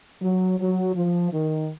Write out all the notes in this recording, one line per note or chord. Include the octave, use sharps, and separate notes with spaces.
F#3
F#3
F3
D#3